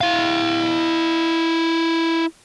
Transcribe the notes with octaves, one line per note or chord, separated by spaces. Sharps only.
E4 F5